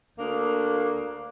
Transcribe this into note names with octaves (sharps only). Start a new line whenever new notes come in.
D2 A#3 D4